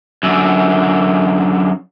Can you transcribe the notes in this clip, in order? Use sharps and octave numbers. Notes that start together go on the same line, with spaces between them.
F#2 D3